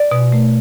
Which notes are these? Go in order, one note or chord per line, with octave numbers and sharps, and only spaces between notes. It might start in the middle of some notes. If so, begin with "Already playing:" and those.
Already playing: D5
B2
A3